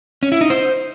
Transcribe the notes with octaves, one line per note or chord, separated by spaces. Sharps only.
C#4
E4
D#4
C5